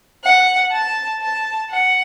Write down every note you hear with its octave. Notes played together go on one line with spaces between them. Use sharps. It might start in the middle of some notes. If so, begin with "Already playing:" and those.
F#5
A5
A5
F#5